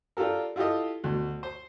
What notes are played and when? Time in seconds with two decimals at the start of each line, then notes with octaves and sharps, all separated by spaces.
0.17 D4 F4 G4 A4 A#4
0.56 E4 F4 G4 A4 D#5
1.04 D2 B2
1.43 C5